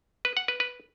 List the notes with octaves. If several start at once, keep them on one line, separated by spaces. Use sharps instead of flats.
B4
F#5
B4
B4